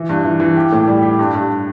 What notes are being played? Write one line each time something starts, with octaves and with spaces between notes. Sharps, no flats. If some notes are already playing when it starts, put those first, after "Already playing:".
Already playing: E3
G2
E3
E3
G4
A2
G3
G4
G2
G2